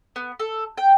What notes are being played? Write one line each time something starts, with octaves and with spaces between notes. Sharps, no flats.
B3
A4
G5